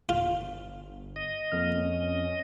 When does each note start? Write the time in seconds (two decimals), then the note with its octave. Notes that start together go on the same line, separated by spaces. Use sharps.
0.09 G1 F4
1.16 D#5
1.52 F2 A#3 F6
1.74 C#4